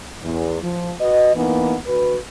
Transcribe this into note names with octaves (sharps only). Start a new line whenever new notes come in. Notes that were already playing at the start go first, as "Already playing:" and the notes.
E2
F3
F#4 B4 D#5
E3 A#3 B3 D#4
D2 F#4 B4